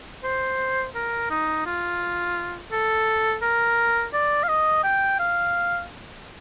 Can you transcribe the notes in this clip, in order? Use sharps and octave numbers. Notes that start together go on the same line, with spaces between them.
C5
A#4
D#4
F4
A4
A#4
D5
F5
D#5
G5
F5